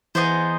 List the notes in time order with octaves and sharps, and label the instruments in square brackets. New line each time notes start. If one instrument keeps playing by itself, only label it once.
[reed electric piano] E3 [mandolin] B3 D#4 G#4 C5